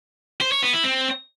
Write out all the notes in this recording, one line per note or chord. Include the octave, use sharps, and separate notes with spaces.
C5
C#5
B3
E4
C4